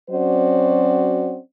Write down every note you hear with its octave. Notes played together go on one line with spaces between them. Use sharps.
F#3 C4 C#4 F#4 C5 D5